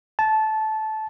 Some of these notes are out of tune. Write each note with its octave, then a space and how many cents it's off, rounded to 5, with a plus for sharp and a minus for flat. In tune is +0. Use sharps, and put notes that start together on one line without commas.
A5 -15